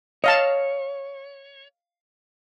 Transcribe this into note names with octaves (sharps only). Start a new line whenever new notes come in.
C#5 D#5 F5 A5